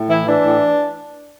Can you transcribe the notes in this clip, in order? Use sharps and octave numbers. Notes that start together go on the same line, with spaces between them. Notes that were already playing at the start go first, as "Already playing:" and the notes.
Already playing: A2
E3 E4
E3 D4
A2